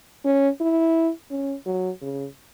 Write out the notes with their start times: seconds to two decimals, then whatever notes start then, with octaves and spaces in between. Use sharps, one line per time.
0.25 C#4
0.61 E4
1.31 C#4
1.66 F#3
2.02 C#3